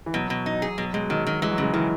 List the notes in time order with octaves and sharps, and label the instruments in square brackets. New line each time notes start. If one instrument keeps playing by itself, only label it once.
[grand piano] E3
[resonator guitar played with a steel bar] B2 [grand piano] F#3
[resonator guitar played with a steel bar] B2
D#4
G#4
[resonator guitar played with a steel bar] B2 [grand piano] F#3
[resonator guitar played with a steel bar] B2 [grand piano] G#3
[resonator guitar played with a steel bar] D#3 [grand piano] F#3
[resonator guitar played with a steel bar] D#3
[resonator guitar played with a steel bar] E3 [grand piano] G#3
[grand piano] F#3
[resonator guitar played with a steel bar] C#3 [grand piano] G#3
[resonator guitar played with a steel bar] D#3 [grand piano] E3